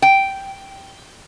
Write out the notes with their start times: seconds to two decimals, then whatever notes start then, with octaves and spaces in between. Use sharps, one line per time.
0.02 G5